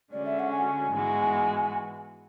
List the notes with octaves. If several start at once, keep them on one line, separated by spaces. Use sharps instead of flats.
D3 G#3 C#4 F#4 D5
E5
F#5
G#5
G#2 E3 G#3 B3 F#4